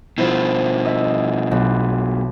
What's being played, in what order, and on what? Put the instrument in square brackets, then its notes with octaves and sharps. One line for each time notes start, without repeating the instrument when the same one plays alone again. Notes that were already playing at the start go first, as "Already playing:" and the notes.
[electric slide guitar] B2 F3 [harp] E4 C5
[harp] D#5 E5
B1